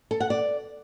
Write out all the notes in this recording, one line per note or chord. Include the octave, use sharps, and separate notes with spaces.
A4
F#5
D5